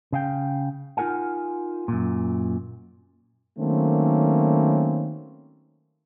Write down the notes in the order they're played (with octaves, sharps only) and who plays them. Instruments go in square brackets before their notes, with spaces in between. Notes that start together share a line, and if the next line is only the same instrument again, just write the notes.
[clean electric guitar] C#3 F5 G5
D#4 F4 G#4 A#4 F#5 G#5
F#2 A#2
[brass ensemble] D#3 F#3 A3 A#3 C4 C#4